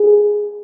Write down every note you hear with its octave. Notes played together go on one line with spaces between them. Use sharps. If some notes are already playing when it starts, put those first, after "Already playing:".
Already playing: G#4